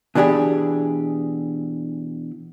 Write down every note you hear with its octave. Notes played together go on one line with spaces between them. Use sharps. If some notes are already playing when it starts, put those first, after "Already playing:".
B2 E3 D4 G4 G#4